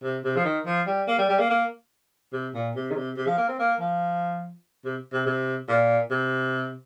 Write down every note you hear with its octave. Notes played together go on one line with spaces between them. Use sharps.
C3
C3
F3
D#3
F3
G3
A#3
G3
G3
A#3
A#3
C3
A#2
C3
D#3
C3
C3
F3
A#3
C4
A#3
F3
C3
C3
C3
A#2
C3